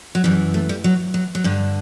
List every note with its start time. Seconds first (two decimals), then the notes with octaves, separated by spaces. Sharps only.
0.15 F#3
0.24 F#2 E3 G3
0.54 A3
0.69 G3
0.84 F#3
1.14 F#3
1.35 F#3
1.44 G2 D3 G3